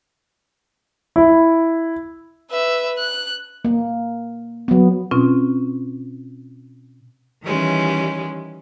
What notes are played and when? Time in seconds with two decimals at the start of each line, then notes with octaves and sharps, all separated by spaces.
1.16 E4
2.51 B4 E5
2.98 F#6
3.65 A#3
4.68 F#3 B3
5.11 B2 C4 C#4 F4
7.44 D#3 E3 G3 G#3 C#4